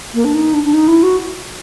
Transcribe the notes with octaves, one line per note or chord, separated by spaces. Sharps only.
A#3
D4
D#4
D4
D4
D#4
E4
F#4